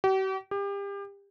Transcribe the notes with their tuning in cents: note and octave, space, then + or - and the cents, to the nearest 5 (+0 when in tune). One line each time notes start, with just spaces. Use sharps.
G4 -45
G4 +30